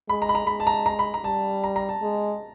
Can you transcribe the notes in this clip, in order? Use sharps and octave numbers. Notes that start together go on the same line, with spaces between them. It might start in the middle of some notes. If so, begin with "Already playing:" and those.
G#3 B5
A#5
B5
A#5
G#3 B5
A5
A#5
A#5
B5
A#5
G3 A5
A#5
A#5
A5
G#3